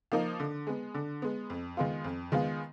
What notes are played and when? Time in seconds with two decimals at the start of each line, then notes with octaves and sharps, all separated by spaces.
0.12 F3 A#3 D#4 A#4
0.40 D3
0.67 G#3 B3
0.94 D3
1.22 G#3 B3
1.50 F2
1.77 D#3 G#3 B3 F4
2.04 F2
2.32 D#3 G#3 B3 F4